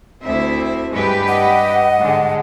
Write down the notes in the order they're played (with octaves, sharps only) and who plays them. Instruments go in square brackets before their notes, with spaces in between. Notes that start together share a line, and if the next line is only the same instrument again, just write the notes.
[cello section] D2 E4 E5 [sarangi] C4
[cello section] G2 G4 B4 [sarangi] G#3
[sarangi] D#5 [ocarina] F#5
[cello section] G#2 D3 G#3